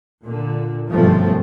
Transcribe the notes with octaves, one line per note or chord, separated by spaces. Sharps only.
A#2 D3
G1 F#2 B2 F3 A3 C4